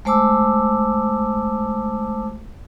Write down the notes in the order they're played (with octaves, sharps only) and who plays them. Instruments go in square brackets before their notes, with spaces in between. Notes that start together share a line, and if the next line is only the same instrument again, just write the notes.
[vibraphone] G#3 A3 C5 A5 D6 E6